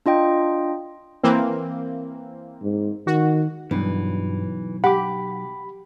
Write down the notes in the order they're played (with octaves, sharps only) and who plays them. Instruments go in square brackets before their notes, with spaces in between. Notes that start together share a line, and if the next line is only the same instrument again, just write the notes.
[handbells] D4 F4 D#5 G5
[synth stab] E3 A#3 C4
[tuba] G#2
[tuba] D#3 [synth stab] F#4
[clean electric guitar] B1 [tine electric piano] G2 [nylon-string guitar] E3
[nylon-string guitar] G4 [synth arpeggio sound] F#5 D6 [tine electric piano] B5